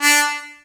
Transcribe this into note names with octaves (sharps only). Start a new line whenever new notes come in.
D4